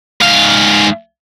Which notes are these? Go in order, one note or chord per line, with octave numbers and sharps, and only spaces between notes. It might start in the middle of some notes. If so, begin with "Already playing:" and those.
G#2 F5